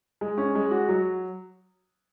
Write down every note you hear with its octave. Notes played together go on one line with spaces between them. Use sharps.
G#3
C#4
G#3
F#4
F#3